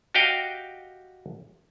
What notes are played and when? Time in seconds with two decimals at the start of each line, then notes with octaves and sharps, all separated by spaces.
0.14 F#4 G4 D#5 F5 G5